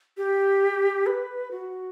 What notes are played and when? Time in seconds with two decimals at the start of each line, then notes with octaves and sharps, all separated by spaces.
0.17 G4
1.06 B4
1.51 F#4